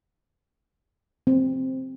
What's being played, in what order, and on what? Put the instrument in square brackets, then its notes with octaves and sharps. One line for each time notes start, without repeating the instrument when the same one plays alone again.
[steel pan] C4